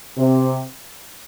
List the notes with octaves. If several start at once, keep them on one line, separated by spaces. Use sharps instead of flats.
C3